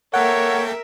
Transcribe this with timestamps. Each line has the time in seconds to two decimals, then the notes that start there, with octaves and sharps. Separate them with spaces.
0.14 A#3 A4 A#4 C#5 E5 F#5 G5